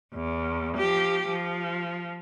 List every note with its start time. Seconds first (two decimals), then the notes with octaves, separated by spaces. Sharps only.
0.14 E2
0.77 F3 G4
1.29 F3